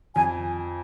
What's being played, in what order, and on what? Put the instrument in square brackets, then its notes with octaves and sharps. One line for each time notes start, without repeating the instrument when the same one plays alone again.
[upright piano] F2 [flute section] G#5